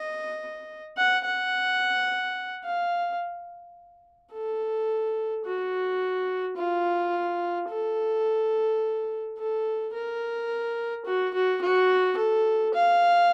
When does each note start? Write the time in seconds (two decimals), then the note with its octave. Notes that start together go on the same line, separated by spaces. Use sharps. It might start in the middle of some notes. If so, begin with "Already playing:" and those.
Already playing: D#5
0.97 F#5
1.25 F#5
2.64 F5
4.33 A4
5.45 F#4
6.57 F4
7.69 A4
9.38 A4
9.94 A#4
11.06 F#4
11.34 F#4
11.62 F#4
12.17 A4
12.74 F5